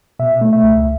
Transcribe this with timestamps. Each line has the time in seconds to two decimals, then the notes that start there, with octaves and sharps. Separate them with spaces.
0.19 B2 E5
0.41 A3
0.53 E5
0.63 C#2